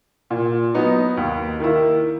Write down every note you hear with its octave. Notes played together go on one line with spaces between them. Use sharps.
A#2
F#3 B3 D#4
D#2
D#3 A#3 E4